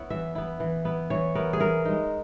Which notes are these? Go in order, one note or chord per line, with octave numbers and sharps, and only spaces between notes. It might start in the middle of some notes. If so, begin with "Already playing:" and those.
Already playing: B3 E4 C#5 F#5
E3 E5
B3 E4
E3
B3 E4
E3 C#5
B3 E4 A#4
G#4
E3 A#4
G#3 D#4